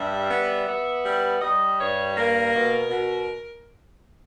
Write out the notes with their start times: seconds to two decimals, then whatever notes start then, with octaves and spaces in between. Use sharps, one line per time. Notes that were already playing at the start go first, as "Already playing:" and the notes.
Already playing: G2 G3 E5
0.30 B3
0.67 B3
1.04 G3
1.41 G3 D#5
1.78 G2 C#5
2.16 A#3 A#4
2.54 B2
2.90 B2